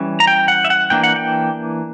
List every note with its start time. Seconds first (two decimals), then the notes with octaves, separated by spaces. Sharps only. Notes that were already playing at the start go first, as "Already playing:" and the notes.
Already playing: E3 G3 C#4
0.20 A#5
0.27 G5
0.48 F#5
0.65 E5
0.70 F#5
0.90 E3 A#3 D4 G5
1.03 F#5
1.16 G5